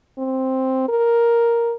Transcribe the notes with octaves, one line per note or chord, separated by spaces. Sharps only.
C4
A#4